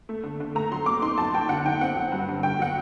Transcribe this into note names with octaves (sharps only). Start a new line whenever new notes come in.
A3
D3
D3
A3 A#5
F#3 C6
A3 D6
D#4 C6
F#3 A5
F#3 G5
D3 F#5
D#4 G5
C4 F#5
F#3
G2
D3
D3 G5
F#3 F#5